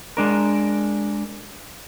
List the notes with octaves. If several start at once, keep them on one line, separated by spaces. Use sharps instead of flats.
G#3 D4 A#4